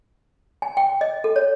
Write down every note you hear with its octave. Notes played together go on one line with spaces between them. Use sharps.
G#5
G5
D#5
A4
C#5